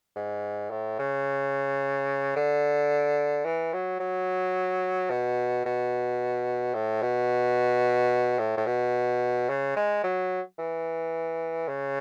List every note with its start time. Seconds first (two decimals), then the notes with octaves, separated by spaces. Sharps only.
0.16 G#2
0.71 A2
0.99 C#3
2.36 D3
3.45 E3
3.73 F#3
4.00 F#3
5.10 B2
5.65 B2
6.74 A2
7.02 B2
8.39 A2
8.57 A2
8.66 B2
9.49 C#3
9.76 G#3
10.03 F#3
10.59 E3
11.68 C#3